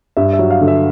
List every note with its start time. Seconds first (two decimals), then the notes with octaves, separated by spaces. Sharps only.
0.17 G2 E5
0.33 E5
0.39 F#3
0.51 F5
0.61 D3
0.68 E5